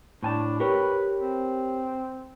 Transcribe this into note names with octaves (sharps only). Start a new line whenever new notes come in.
A2 D4 G#5 A5
G4 A#4 B4 C#5
C4